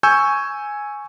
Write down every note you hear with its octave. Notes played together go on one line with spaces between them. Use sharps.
G#5 C#6 E6 G6